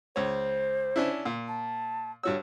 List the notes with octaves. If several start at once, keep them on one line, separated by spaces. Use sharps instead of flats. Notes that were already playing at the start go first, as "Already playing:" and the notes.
C#2 C5 C#5
C#4 D4 E4
A#2
A5
G2 F#4 C#5 E6